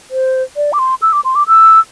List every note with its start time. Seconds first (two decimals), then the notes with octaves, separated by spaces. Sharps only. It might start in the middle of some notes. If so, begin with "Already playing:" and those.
0.11 C5
0.57 D5
0.73 D6
0.79 C6
1.02 E6
1.13 D6
1.25 C6
1.35 D6
1.48 E6